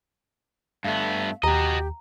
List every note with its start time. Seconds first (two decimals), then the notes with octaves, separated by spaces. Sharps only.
0.84 G2 A3 B3 F5
1.44 D#2 F#4 G4 D#5 A#5